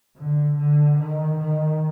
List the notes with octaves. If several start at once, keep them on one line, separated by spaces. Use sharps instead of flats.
D3
D3
D#3
D#3